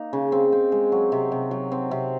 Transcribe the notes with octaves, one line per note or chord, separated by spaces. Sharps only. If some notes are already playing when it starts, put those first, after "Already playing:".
Already playing: A#3 D#4
C#3
C4
C4
G#3
F#3
C3
C3
F#3
C4
C3